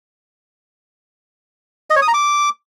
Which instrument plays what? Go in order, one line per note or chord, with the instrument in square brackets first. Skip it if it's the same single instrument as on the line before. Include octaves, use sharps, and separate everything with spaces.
[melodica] D#5
C#5
D#6
A#5
D6